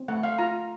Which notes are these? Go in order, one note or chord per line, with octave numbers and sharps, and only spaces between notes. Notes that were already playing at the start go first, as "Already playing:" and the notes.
Already playing: C4
A3 F#5
F5
F4 A#5